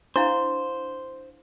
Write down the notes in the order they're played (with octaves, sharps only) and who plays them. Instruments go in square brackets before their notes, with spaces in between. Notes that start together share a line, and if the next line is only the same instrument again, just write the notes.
[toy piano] D4 E4 F5 [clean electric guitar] C5